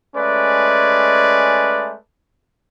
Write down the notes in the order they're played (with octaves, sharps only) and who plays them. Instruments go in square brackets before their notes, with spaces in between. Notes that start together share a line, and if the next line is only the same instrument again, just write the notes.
[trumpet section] G#3 A3 C#4 B4 D5